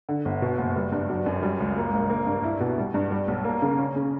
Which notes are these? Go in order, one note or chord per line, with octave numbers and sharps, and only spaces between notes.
D3
G1
B2
F#1
G3
G2
F#3
F#2
G3
C#2
A#3
A#1
A#3
G2
E4
B2
G3
G2
G3
B1
A#3
C#3
C#4
C#3